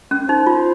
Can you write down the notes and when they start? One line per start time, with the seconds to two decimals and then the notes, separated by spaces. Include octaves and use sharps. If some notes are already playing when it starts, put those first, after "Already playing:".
0.11 C#4
0.29 D#4 C5
0.47 F4